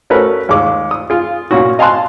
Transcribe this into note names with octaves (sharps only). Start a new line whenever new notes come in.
A3 C#4 F#4 A#4 B4
D#2 G#3 D6
D#6
F4 G#4
A#2 C#4 F#4
D#5 F5 G#5 A5 C6 F#6